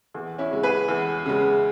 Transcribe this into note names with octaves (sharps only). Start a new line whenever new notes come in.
E2
C#4 E4
C#3 G#3
G#4 B4
E2
C#3 G#3